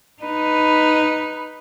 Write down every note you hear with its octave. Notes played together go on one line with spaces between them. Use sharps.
D#4 B4